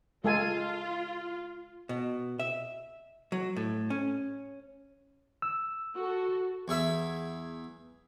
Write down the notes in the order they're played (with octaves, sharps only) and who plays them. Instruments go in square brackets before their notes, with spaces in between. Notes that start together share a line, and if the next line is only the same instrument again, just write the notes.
[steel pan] G#3 A4 G#5 [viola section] F4
[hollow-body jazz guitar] B2
E5
F#3
A2
C#4
[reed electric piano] E6
[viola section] F#4 A4
[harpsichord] E2 G#4 E5 B5